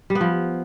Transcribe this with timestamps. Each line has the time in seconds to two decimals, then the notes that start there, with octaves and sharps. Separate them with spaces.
0.10 G3
0.15 B3
0.21 F3